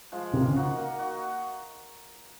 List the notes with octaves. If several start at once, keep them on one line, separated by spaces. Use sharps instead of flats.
F3 G#3
C3 A#3
C#3
D#4 F#4
A#3
D#4 F#4